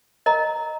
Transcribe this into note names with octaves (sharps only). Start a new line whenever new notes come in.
A#4 D#5 A#5